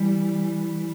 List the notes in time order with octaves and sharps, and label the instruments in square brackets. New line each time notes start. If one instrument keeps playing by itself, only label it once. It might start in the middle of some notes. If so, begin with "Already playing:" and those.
Already playing: [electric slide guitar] E3 [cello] G3